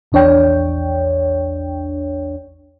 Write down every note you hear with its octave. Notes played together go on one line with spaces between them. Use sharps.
A#1 E2 D4 C#5 G5